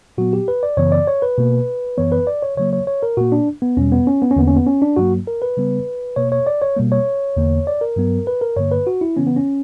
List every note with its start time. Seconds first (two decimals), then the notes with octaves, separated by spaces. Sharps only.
0.18 A#2 F#3 B3 F#4
0.33 G4
0.48 B4
0.63 D5
0.77 F#2 C#3 E3 B3 C#5
0.92 D5
1.07 C#5
1.22 B4
1.38 B2 A#3
1.97 F#2 E3 B3 C#5
2.12 B4
2.27 D5
2.42 C#5
2.57 C#3 F#3 A#3 C#5
2.73 C#5
2.87 C#5
3.03 A#4
3.17 A#2 A#3 F#4
3.32 D4
3.62 B3
3.77 E2 B2 G3 C#4
3.92 B3
4.07 C#4
4.22 B3
4.31 C#4
4.36 E2 D3 A#3 B3
4.48 C#4
4.57 B3
4.67 C#4
4.82 D4
4.97 G2 F#3 A#3 F#4
5.27 A#4
5.42 B4
5.57 C#3 G3 B3
6.16 B2 A#3 C#5
6.32 C#5
6.47 D5
6.62 C#5
6.77 B2 G3 A#3
6.92 C#5
7.37 E2 D3 A#3
7.67 D5
7.81 A#4
7.96 G2 F#3 B3
8.27 B4
8.41 A#4
8.56 G2 D3 A#3 C#5
8.71 B4
8.87 F#4
9.01 E4
9.17 C#3 E3 B3 C#4
9.27 B3
9.36 C#4